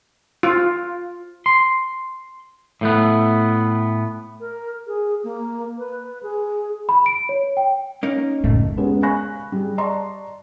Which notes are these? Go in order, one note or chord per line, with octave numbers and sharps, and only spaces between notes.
F4
C6
A2 A3 B3
A#4
G#4
A#3
B4
G#4
B5
D7
C#5
G5
A#3 C#4 D#4
C#2 F#2 A2 A3
G#3 B3 C#4 G4 G#4 A#4
F5 G#5 B5 C#6 F#6 A#6
G3 G#4
D5 D#5 A5 A#5 C6 C#6